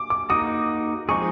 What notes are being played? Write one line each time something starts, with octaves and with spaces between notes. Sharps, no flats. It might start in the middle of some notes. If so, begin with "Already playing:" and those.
Already playing: D6
D6
A#3 D#4 F#4 D#6
F3 G#3 C4 D#4 G#4 C#6